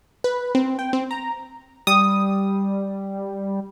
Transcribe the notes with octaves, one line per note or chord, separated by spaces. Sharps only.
B4
C4
G5
C4
A#5
G3 D#6